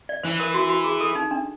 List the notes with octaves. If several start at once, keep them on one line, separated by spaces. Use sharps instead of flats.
D5
E3 C5
A#4
F#4
F#4
G#4
A4
D#4
D4